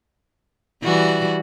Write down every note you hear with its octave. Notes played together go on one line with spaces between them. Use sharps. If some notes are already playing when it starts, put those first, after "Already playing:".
E3 G3 F#4